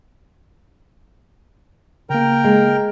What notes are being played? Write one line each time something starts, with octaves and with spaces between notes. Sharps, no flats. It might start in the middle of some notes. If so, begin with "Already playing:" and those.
C#3 A#3 A#4 G5 A#5
G#3